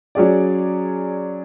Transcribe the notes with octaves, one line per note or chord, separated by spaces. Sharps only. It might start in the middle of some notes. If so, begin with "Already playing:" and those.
F#3 C#4 G#4 D5